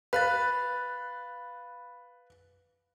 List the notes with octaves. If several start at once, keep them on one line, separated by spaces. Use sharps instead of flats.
B4 F5 B5 F#6 A6